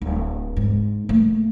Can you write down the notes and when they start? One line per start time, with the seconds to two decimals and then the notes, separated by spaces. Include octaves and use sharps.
0.02 D1
0.57 G#2
1.09 A3 A#3